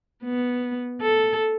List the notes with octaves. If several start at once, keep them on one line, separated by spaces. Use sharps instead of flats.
B3
A4